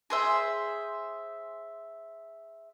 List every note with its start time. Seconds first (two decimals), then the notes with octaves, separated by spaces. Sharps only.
0.10 G#4 C5 E5